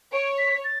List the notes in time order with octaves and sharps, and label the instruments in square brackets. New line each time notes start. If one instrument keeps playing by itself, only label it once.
[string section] C#5 [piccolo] D7
[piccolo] B6
A6